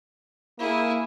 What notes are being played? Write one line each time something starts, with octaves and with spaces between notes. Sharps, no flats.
A#3 E4 G#4